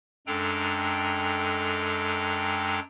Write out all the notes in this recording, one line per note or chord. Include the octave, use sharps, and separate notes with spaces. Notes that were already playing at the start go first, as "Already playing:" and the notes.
F#2 G#3 D4 A4 G5 A#5